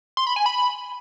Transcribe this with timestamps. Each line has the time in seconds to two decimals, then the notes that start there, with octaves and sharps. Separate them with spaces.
0.17 C6
0.27 B5
0.36 G#5
0.46 B5